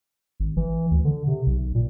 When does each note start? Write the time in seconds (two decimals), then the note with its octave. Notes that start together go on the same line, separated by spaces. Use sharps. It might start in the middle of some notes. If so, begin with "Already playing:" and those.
0.40 G#1
0.57 E3
0.91 D2
1.05 D3
1.27 C3
1.47 B1
1.75 A#2